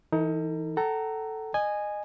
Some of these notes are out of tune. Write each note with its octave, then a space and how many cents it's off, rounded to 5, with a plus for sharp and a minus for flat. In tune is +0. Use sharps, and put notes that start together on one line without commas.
E3 +0 D#4 +30 A4 +45
A4 +0 F#5 +40 A#5 -10
D#5 -25 G#5 -5